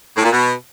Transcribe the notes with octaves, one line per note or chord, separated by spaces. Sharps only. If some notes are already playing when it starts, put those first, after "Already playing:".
A2
A#2
B2